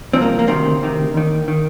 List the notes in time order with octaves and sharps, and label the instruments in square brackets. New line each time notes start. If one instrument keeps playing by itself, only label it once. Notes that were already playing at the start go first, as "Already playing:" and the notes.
[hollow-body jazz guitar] C2 C3 F3 C4
A#3
A#3
D2 C3 D#3 C4
D2 C3 D#3
D#2 D#3
D#3